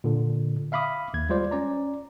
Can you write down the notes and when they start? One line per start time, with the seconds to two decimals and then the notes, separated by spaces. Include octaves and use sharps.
0.04 A#2 D3
0.72 E5 F5 B5 D6 D#6
1.14 D#2 G#6
1.29 G3 G#3 F4 C5 D5
1.51 C#4 D5 A#5